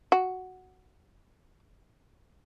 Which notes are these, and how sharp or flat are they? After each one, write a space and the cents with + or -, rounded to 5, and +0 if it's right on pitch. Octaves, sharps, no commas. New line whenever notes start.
F#4 +0